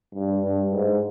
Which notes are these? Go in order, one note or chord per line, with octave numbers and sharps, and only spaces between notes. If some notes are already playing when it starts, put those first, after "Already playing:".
G2
G2
G#2